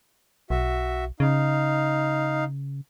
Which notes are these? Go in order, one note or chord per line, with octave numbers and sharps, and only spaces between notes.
B1 F#4 E5
C#3 D#4 F5